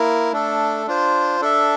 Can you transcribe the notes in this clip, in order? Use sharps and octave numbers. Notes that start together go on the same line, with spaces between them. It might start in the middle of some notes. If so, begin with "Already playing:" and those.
Already playing: A#3 E4 A#4
A3 D4 A4
D4 F4 C5
D4 A4 E5